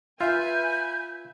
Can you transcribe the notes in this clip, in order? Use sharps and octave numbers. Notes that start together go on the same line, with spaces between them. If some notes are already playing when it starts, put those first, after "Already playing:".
F4 B4 E5 G#5 G6